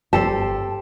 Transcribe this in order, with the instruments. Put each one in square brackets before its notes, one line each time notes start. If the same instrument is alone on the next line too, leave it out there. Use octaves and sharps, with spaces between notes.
[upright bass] G1 [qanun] G4 A4 C5 [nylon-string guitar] A5